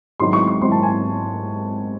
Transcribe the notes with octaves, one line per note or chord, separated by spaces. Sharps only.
G#1 G#2 F#3 C4 E4 C6
C#6
C#6
G#1 G#2 F#3 C4 E4 C6
A5
G#5